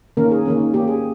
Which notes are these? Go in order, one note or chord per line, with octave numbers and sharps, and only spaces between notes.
D#3 A#3 C#4 A#4
G#4
D#3 A#3 C#4
D#3 A#3 C#4 G4
G#4